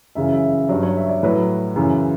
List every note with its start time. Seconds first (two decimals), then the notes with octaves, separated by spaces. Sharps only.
0.15 F#2 C#3 E3 E5
0.33 E5
0.51 E5
0.69 G2 F#3 D5
0.83 C#5
0.97 E5
1.09 D5
1.23 A2 F#3 B4
1.76 F#2 C#3 E3